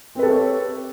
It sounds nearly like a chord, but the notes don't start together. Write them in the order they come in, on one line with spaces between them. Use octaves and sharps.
C4 B4 A4 G4 C#5